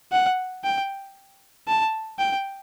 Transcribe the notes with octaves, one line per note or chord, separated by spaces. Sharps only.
F#5
G5
A5
G5